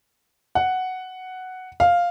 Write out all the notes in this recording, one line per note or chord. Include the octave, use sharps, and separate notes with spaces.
F#5
F5